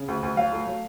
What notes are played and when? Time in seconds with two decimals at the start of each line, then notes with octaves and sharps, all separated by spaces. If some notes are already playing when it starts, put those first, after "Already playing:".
Already playing: C#3
0.08 D2
0.23 D2
0.37 F#3 F5
0.52 A3
0.67 F#3